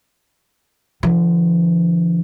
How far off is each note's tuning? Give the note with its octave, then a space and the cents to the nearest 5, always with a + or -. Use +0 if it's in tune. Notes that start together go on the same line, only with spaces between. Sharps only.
D3 +0 F3 -40